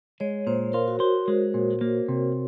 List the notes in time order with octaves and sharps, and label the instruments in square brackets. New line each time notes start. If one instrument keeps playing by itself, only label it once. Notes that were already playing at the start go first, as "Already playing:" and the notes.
[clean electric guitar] G#3 [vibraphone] C#5
[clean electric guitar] A#2 [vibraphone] C5
[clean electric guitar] F4 [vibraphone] A#4
[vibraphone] F#4
[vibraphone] F#4 [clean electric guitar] C5
[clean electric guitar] G#3
A#2
A#3
C3